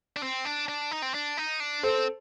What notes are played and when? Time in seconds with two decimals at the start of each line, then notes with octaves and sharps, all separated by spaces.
0.16 D4
0.23 C4
0.45 D4
0.68 D4
0.91 D#4
1.02 C4
1.14 D4
1.37 D#4
1.60 D4
1.83 C4 A4 C5